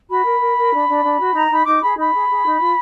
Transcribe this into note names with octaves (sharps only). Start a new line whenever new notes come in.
F#4 B5
A#4
A#4
A#4
D4
D4
D4
F#4
D#4 A#5
D#4 B5
D#4 D6
G#4 B5
D#4 B5
G#4
G#4
D#4
F4